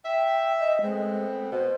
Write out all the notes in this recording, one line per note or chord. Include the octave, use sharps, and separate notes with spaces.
E5 G5
D#5
G#3 A3 B3 C4
B2 C5